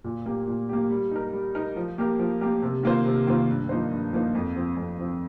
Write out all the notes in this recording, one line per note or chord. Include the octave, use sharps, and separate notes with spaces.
A#2
A#3 G4
A#2
A#3 G4
G3
D#4 A#4
G3
D#4 A#4
F3
A#3 G4 A#4
F3
A#3 G4 A#4
C3
D#3 A#3 F4 C5
C3
D#3 A#3 F4 C5
G2
F3 A#3 D#4 C5
G2
F3 A#3 D#4 C5
F2
F3 C4
F2
F3 C4